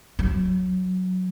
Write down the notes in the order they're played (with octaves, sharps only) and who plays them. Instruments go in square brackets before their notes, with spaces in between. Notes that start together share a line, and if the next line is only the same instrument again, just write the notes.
[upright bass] F#3